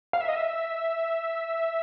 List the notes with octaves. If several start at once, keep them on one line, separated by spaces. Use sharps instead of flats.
F5
E5
D#5
E5